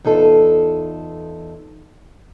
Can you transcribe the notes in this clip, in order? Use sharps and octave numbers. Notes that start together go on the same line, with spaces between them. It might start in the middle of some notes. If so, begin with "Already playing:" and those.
E2 D#4 F4 A4